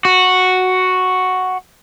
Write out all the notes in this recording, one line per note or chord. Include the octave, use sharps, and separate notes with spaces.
F#4